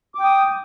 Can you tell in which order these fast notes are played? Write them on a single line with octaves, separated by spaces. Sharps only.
D6 G5 D#6